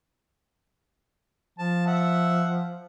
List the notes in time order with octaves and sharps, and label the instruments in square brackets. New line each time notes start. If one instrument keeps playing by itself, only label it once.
[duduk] F3 [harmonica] A5
[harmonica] E5 F#5